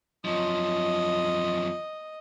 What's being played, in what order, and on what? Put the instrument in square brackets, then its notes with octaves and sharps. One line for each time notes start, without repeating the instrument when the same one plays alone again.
[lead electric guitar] F#2 F3 [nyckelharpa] D#5